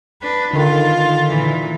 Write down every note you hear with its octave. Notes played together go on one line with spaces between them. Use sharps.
D4 B4
D3 D#3 F4
A#2 E3